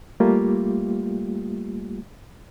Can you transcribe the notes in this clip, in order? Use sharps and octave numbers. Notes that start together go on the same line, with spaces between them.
G3 A3 A#3 F4 G4